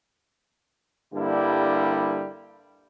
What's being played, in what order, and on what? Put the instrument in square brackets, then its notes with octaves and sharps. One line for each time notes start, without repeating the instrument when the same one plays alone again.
[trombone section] G2 D3 G3 A#3 E4